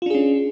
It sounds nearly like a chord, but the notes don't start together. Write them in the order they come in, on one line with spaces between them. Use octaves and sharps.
F4 D4 G#4 C#4